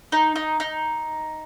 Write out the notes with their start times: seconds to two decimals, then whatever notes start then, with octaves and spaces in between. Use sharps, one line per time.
0.12 D#4
0.36 D#4
0.60 D#4